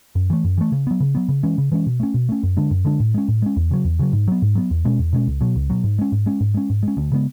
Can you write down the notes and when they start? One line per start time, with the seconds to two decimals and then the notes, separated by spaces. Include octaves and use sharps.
0.15 F#2
0.30 E3 A3
0.44 F#2
0.58 E3 A3
0.72 C#3
0.87 F#3 B3
1.00 C#3
1.15 F#3 B3
1.29 C#3
1.43 E3 G#3 C#4
1.58 C#3
1.72 E3 G#3 C#4
1.86 B2
2.00 A3 C#4
2.14 B2
2.29 A3 C#4
2.43 F#2
2.57 D3 G#3 D4
2.71 F#2
2.85 D3 G#3 D4
3.00 A2
3.14 G#3 C#4
3.28 A2
3.42 G#3 C#4
3.56 E2
3.71 C#3 F#3
3.85 E2
3.99 C#3 F#3
4.13 G#2
4.28 F#3 B3
4.42 G#2
4.55 F#3 B3
4.71 E2
4.85 B2 G#3 C#4
4.99 E2
5.13 B2 G#3 C#4
5.27 C#2
5.41 B2 F#3
5.56 C#2
5.70 B2 F#3
5.84 G#2
5.99 G#3 C#4
6.12 G#2
6.26 G#3 C#4
6.40 G#2
6.54 G#3 C#4
6.70 G#2
6.83 G#3
6.88 C#4
6.97 D2
7.12 C#3 G#3 B3